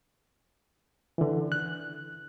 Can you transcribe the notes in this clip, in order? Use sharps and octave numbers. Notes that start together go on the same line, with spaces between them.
D3 E3
F#6